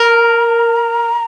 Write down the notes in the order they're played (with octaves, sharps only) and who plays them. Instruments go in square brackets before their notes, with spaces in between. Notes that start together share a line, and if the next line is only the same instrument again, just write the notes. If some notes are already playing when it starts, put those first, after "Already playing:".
Already playing: [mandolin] A#4 [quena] A#5